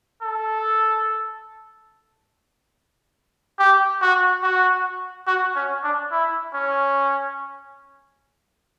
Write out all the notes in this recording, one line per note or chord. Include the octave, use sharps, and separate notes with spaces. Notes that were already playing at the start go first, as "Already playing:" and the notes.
A4
G4
F#4
F#4
F#4
C#4
D4
E4
C#4